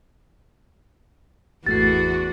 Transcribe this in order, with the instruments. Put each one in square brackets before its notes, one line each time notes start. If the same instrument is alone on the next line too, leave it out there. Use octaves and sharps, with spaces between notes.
[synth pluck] G#1 A3 C7 [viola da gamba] E2 [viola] F#4 [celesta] A6